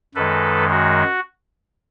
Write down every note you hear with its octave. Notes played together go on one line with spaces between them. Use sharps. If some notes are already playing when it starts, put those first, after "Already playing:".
F#2 D#3 G#3 A4 B4
F#4